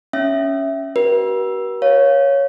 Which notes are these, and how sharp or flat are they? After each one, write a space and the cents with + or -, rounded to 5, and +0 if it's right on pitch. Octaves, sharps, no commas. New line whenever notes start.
C#4 +0 E5 +0
F#4 +40 A#4 +45
C#5 +0 F5 +0